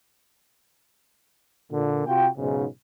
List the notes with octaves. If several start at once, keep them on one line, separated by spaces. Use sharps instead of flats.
A#2 D3
C3 F4 F#4 G5
B1 G#2 C#3